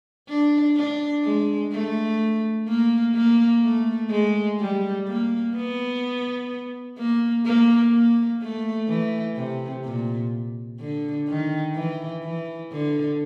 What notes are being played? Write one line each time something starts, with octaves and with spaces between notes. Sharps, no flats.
D4
D4
G#3
A3
A#3
A#3
A3
G#3
G3
A#3
B3
A#3
A#3
A#3
A3
E3
C3
A#2
D3
D#3
E3
E3
D3